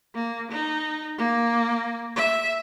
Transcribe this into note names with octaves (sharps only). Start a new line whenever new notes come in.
A#3
D#4
A#3
E5